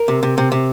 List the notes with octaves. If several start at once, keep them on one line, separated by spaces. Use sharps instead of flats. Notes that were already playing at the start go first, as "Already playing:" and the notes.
Already playing: A#4
C3
C3
C3
C3